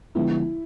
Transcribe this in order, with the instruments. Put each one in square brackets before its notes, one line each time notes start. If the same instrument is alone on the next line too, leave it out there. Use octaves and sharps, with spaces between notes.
[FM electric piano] D3 F3 G#3 B3 [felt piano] E4